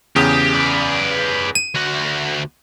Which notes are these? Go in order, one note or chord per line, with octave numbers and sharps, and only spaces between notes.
E2 C#3 G4 D#6
B4 D5
D#7
D2 F#4